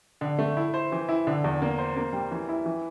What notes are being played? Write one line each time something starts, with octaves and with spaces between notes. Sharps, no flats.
D3
A3
E4
C5
E3
E4
D3
E2
A#3
C5
A#3
G3
E3
E4
E3